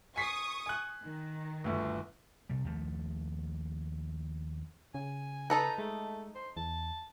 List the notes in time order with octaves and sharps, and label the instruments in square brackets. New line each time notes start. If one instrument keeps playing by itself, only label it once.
[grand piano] G#5 B6 C7 [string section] C#6 D#6
[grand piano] G#5 F#6
[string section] D#3
[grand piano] G1 D2
[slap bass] C3 G3
D#2 F3 A3
[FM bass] C#3 [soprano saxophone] G#5
[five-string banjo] D#4 A4 B4 [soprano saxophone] A#5
[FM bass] G#3 [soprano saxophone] A3
[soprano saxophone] C5
[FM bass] E2 [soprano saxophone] A5